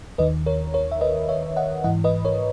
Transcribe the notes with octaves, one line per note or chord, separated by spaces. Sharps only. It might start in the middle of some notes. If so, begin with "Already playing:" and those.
D#2 D#3 B4 D#5
A#4 C#5
A#4 C#5
E5
B4 D#5
C#5 E5
D#5 F#5
G#2 E3 D#5 F#5
B4 D#5
A#4 C#5